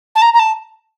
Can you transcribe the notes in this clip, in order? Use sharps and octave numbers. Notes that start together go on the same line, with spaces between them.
A5
A#5
A#5
A5